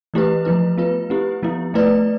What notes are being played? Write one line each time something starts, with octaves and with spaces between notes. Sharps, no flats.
E3 A3 E4 G4 B4
F3 A3 E4 B4
B3 F4 B4
C4 E4 G4
F3 B3 E4
A3 E4 B4 D5